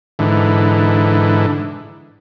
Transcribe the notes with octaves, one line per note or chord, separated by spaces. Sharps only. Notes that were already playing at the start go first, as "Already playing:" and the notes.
G#2 D3 E3